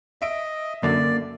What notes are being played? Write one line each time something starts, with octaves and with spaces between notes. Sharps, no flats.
D#5 E5 D7
F#2 D3 A#3 D5